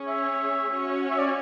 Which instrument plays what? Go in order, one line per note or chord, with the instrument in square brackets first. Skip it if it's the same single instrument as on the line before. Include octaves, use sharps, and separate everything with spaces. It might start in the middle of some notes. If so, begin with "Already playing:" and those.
Already playing: [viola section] C#4 G#4 C#5
[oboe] E5
[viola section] C#4 F#4 C#5
[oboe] E5
D5